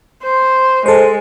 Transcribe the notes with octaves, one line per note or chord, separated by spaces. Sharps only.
C5
G#3 A4 C5